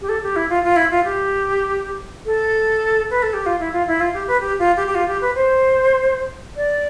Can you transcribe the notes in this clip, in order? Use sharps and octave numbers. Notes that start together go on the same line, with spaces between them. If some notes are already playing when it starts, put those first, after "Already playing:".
G4
A4
G4
E4
F4
F4
E4
F4
G4
A4
B4
A4
G4
F4
E4
F4
E4
F4
G4
B4
G4
F4
G4
G4
F4
G4
B4
C5
D5